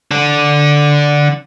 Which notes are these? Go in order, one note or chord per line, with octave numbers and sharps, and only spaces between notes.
D3 D4